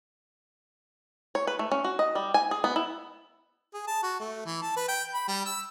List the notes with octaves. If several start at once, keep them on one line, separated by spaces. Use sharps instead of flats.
C#5
B4
A3
C#4
F#4
D#5
G3
G#5
G#4
B3
E4
G#4
A5
F#4
A3
E3
A5
B4
G5
B5
G3
E6